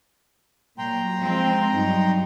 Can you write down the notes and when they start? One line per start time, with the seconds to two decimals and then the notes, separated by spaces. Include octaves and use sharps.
0.78 A#2 F#3 G5 A#5 C6
1.21 F3 G#3 C4
1.71 G2 F#3 D#4